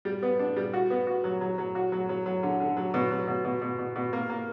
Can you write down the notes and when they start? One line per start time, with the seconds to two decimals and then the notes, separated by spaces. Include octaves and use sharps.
0.05 G3
0.23 B3
0.39 D4
0.56 G3
0.73 F#4
0.90 B3
1.07 F#4
1.24 F#3
1.41 F#3
1.58 F#3
1.75 F#4
1.92 F#3
2.09 F#3
2.26 F#3
2.43 D3
2.60 D3
2.77 F#3
2.94 B2
3.11 F#3
3.28 B2
3.45 B2
3.62 B2
3.79 B2
3.96 B2
4.13 A#3
4.30 A#3